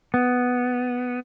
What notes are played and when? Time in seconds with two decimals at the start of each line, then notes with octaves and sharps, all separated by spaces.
0.14 B3